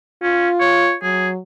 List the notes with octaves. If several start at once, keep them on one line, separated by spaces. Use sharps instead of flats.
C#4 F4
C#5
F#3 G#4